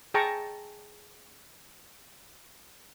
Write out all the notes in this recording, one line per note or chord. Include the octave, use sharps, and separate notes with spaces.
G#4 G5 A5 A#5 C#6